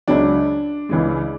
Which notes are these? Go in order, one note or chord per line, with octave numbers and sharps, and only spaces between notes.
C#2 C#3 F#3 D4
C#2 C#3 E3 G#3